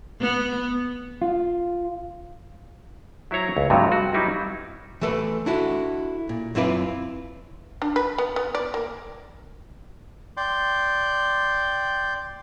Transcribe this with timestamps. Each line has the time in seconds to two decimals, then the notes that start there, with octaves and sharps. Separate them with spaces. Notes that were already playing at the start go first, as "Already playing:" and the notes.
0.21 B3
1.22 F4
3.31 F#3 E4 C5 C#5 A#5
3.57 C#2
3.70 G2 C3 F3 F#3 A3 F#4
3.92 F#4
4.14 F#3 G3 D#4 E4
5.01 E3 A3 A4 B4 D5
5.46 D4 E4 F#4 A4
6.29 A#2
6.55 F#2 C4 E4 F4 B4 D5
7.82 D4
7.96 B4
8.18 B3
8.36 B3
8.55 D5
8.74 A#3
10.37 D5 G5 C6